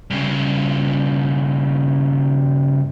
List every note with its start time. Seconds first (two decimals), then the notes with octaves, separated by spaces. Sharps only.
0.10 G2 C#3